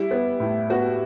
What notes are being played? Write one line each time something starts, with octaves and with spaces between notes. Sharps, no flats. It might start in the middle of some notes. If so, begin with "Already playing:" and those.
Already playing: G3 E4
B3
A2
B3 F#4